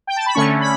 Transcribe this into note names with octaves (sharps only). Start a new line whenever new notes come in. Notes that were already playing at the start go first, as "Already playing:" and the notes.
G5
A5
B5
D3 A3 C#4 C#6
B5